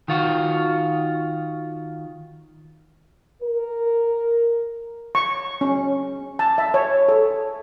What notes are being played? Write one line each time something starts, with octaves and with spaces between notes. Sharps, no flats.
D#3 F4 F#4
A#4
C#6
C#4
A5
E5
C#5
A4
A4